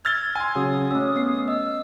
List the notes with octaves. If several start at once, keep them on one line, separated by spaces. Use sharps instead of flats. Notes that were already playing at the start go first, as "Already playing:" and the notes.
E6 F6 G#6 A6 G7
G#5 C6
C#3 F#3 D#6
A3 C#4 E6
B3 C7
D#5 E6